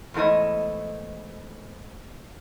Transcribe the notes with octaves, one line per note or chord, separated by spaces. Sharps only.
E2 G#2 A3 E4 D#5